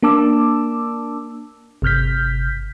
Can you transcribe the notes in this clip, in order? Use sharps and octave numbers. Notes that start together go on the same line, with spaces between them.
A#3 D4 A5 D6 E6
G1 C3 F6 G6 B6